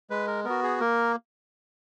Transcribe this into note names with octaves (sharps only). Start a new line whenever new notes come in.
G#3 B4
A#4
B3 A#4
F#4
G#4
A#3 A#4